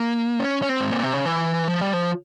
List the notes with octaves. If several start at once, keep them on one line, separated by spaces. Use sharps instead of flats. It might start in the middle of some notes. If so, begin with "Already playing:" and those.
Already playing: A#3
C#4
C#4
C4
G#2
A#2
C3
C#3
E3
F3
G3
F3